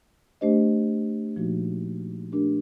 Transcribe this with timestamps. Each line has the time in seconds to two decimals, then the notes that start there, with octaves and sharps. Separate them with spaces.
0.41 A3 D4 G4 C5 D#5
1.36 A#2 F3 A#3 D#4 F#4
2.32 A3 D4 G4 A#4